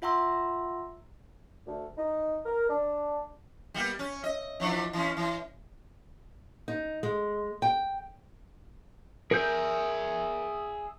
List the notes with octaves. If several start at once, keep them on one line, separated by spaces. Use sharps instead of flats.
F4 E5 F#5 A#5 C6 E6
D2
D#4
A#4
D4
G3 A#3 B3
C#4
D#5
E3 F3 D4
E3 C#4
E3
D#4
G#3
G5
G#4 A#4 E5 G6